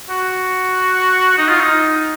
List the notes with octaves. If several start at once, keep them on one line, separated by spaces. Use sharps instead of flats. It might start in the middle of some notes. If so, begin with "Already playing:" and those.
F#4
D#4
F4
D#4